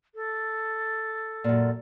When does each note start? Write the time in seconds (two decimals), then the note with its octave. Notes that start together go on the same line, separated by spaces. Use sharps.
0.15 A4
1.44 F#2 A#2